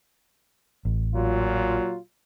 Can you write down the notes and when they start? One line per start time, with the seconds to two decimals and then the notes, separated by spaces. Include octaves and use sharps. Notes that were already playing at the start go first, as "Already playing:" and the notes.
0.85 A1
1.15 A#2 F#3 F4